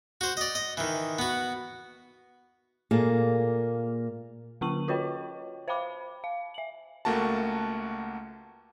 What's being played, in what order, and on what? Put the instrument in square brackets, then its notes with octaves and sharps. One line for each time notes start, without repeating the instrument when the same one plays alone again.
[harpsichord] F#4 C5
D5 D#5
D#5
D#3 E3
B3 F#4
[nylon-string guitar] A#2 A#3 G#4 A4
[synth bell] D3 A#3 C#4 C#6 D#7 F#7
F4 F#4 B4 C#5 D#5 G5
C5 F5 G5 B5 D6
F5
E5 F#7
[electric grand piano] C#2 A3 A#3 F#4 A5